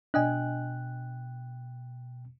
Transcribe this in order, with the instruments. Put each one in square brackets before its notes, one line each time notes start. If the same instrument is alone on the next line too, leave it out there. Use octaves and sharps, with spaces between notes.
[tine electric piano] B2 G5 F#6 [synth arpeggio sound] D4 D#5 G#5